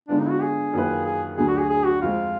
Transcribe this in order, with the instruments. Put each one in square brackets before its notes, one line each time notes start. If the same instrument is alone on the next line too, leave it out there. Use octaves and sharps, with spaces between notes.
[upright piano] D3 G#3 B3 F4 [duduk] D4
[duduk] D#4
F#4
G#4
[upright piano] F#2 D#3 A#3 F4 B4
[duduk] G#4
[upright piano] D2 D3 F#3 [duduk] G#4
[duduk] F#4
G#4
G#4
F#4
[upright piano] F2 F3 G#3 [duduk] F4